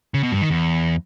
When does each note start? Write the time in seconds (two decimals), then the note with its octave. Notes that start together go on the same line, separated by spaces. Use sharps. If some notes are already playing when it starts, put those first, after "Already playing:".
0.14 C#3
0.23 B2
0.32 G2
0.41 D#3
0.50 E2